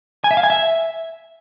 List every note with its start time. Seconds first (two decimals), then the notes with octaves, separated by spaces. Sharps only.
0.24 G#5
0.31 E5
0.37 F5
0.44 G#5
0.50 E5